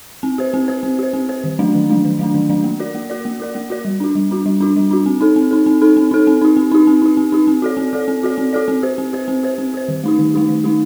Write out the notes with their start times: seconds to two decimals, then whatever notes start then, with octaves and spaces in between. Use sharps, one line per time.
0.23 C4
0.38 G4 C5
0.54 C4
0.68 G4 C5
0.83 C4
0.99 G4 C5
1.13 C4
1.29 G4 C5
1.44 D#3
1.59 F#3 A3 D4
1.75 D#3
1.90 F#3 A3 D4
2.05 D#3
2.19 F#3 A3 D4
2.34 D#3
2.49 F#3 A3 D4
2.64 A#3
2.80 F#4 A#4 D5
2.95 A#3
3.10 F#4 A#4 D5
3.25 A#3
3.40 F#4 A#4 D5
3.55 A#3
3.70 F#4 A#4 D5
3.85 G3
4.00 D4 F#4
4.15 G3
4.31 D4 F#4
4.46 G3
4.61 D4 F#4
4.76 G3
4.91 D4 F#4
5.06 C4
5.21 D#4 A4
5.36 C4
5.51 D#4 A4
5.66 C4
5.82 D#4 A4
5.97 C4
6.11 D#4 A4
6.27 C4
6.41 D#4 G4
6.57 C4
6.72 D#4 G4
6.87 C4
7.02 D#4 G4
7.17 C4
7.32 D#4 G4
7.47 C4
7.62 F#4 A4 D5
7.77 C4
7.93 F#4 A4 D5
8.08 C4
8.23 F#4 A4 D5
8.38 C4
8.53 F#4 A4 D5
8.68 C4
8.83 G4 C5
8.98 C4
9.13 G4 C5
9.28 C4
9.43 G4 C5
9.58 C4
9.74 G4 C5
9.88 D#3
10.04 A3 D#4 G4
10.19 D#3
10.34 A3 D#4 G4
10.49 D#3
10.64 A3 D#4 G4